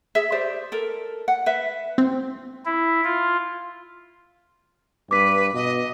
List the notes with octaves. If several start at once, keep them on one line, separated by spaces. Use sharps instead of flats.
G#4 E5
G4 C5 D5
A4 A#4
F#5
B4 E5
C4
E4
F4
G2 B4 D6 B6
B2 D#5